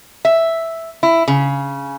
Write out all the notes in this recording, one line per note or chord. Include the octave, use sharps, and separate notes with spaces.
E5
E4
C#3